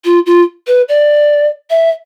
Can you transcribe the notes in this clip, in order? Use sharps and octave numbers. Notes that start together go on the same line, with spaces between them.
F4
F4
B4
D5
E5